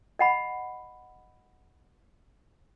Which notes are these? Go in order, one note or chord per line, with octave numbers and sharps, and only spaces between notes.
D#5 F#5 B5